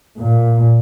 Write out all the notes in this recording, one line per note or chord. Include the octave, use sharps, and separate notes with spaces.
A#2